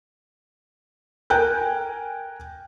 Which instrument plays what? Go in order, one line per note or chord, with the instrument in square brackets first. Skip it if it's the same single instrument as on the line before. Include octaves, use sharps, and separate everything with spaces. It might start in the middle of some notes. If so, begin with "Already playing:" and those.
[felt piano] A#4 G5 G#5 F#6 G6